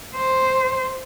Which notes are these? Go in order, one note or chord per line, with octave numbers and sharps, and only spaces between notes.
C5